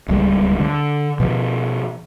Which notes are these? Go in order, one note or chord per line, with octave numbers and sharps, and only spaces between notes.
D1 C#2 G3 G#3
D3
B2 F3